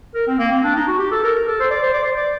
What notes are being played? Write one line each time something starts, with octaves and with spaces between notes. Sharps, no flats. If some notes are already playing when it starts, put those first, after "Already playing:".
A#4
C4
A#3
C4
D4
D#4
F#4
G4
A4
A#4
A#4
A4
C5
D5
C5
D5
C5
D5